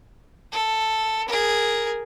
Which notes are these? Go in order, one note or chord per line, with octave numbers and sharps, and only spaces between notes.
A4
G#4 A#4